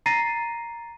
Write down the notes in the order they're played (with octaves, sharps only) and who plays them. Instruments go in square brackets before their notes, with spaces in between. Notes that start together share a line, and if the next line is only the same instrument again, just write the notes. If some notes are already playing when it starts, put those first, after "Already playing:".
[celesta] A#5 A6 A#6 C7 D#7